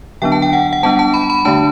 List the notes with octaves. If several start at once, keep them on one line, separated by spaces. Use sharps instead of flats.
D3 F#3 B3 D4 G5
A5
G5
F#5
F#5
G3 B3 D4 A5
A5
B5
B5
D3 A3 D4 A5